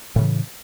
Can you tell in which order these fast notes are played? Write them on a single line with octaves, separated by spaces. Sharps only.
A2 C#3 E3